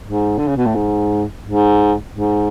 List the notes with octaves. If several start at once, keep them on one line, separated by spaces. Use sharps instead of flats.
G#2
D3
C#3
B2
A2
G#2
G#2
G#2